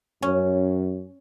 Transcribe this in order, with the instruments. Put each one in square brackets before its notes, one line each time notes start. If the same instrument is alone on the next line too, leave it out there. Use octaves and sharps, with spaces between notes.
[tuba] F#2 [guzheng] C#4